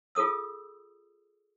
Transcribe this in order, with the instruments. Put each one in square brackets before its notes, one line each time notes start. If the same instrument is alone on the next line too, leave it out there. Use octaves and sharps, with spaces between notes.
[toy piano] F4 G#4 A4 D#6 E6